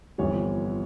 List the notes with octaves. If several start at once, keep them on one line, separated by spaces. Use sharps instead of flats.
G1 F2 E3 G3 C#5